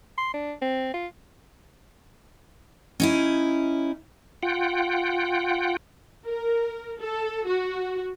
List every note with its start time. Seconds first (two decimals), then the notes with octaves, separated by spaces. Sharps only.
0.18 C6
0.34 D4
0.62 C4
0.94 F4
3.00 C#4 D#4 E4
4.43 F4 F#5 G5
6.26 A#4
7.00 A4
7.47 F#4